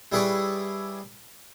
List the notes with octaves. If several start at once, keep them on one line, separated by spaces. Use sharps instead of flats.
G3 E4 G#4 B4 C#5 D5